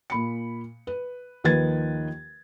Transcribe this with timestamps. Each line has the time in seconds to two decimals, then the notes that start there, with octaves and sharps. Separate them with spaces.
0.10 A#2 B5 C#7
0.87 B4
1.44 D#2 D#3 F3 B4 G#6 A6